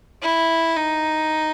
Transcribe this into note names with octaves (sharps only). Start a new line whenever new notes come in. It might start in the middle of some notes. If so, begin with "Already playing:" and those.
E4
D#4